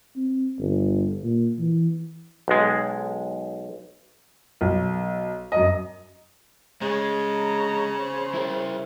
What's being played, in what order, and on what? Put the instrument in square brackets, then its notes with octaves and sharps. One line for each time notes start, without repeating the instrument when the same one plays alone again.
[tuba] C4
G1
A#2
E3
[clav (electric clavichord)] B1 G#3
[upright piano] B1
F#2 D#5
[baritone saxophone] C#3 [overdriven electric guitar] G#3
[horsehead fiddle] A#5
C5
[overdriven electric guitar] E4 A#4